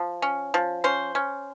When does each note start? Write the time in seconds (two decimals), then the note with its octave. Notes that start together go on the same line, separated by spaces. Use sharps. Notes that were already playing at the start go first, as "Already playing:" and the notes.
Already playing: F3
0.22 C#4
0.54 F3
0.84 C#4 C5
1.15 C#4